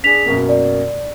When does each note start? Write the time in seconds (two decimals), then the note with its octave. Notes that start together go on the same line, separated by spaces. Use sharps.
0.04 D4 G#4 B6 F7
0.26 F#2 B2 A#3
0.49 D5